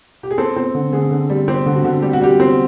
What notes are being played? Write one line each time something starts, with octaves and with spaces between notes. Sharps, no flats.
G4
G#4
C4 A4
C4
D3
D3 G#4
D3
G3
C4 G4
D3
F#4
D3
G3 G4
F#4
G3 G4
C4